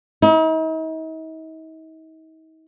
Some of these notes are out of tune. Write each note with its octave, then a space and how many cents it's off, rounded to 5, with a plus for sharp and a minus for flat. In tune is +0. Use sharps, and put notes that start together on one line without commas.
D#4 +45